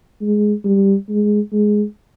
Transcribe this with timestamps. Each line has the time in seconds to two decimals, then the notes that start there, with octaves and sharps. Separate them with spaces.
0.22 G#3
0.64 G3
1.09 G#3
1.53 G#3